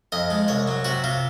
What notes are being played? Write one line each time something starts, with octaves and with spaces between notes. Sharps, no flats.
F2 D#5
G#3
C2 C#5
F#3
C3 F#4
C3 F4